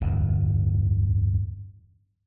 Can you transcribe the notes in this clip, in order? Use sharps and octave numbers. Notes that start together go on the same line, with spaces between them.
D1 G1 E2